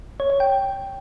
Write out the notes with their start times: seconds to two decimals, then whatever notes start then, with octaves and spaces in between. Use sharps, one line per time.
0.20 C#5
0.30 C#5
0.40 G5